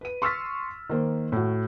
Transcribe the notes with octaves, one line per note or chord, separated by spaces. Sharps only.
B4 D#7
C6 C#6 E6 F6 A6 B6
D#3 A#3 C5
A2 F#4